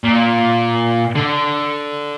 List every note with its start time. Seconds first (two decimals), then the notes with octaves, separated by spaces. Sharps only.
0.04 A#2
1.15 D3